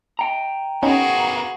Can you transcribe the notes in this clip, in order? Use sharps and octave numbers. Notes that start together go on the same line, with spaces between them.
G5 A#5
B3 C#4 D#4 F#4 G#4 A#4